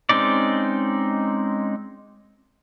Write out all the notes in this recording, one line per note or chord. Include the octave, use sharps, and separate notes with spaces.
G#3 C4 C#4 D#4 D5